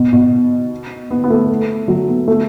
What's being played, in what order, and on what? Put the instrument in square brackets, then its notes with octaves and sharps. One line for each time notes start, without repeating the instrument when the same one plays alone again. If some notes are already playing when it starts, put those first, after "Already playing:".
Already playing: [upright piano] B2
B2
B3
B3
A3
F#3
B3
A3